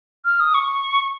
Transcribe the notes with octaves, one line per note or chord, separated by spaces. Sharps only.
F6
D#6
C#6